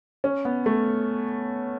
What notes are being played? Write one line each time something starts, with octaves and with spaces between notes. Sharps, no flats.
C#4
B3
A3